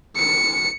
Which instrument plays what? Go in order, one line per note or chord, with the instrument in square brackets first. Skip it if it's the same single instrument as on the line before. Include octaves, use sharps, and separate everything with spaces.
[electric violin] C#7